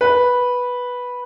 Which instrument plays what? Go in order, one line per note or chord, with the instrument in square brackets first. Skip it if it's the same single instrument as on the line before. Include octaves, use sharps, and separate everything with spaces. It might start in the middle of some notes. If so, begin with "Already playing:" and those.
[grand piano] B4